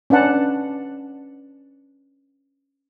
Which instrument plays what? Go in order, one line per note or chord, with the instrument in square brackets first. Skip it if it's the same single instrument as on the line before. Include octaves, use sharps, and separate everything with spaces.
[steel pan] C#4 D4 B4 F#5 A5